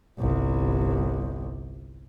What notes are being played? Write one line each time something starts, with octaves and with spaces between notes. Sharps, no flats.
G1 C2